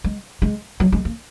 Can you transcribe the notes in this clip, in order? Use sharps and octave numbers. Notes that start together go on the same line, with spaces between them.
G#3
G#3
F#3
G#3
A#3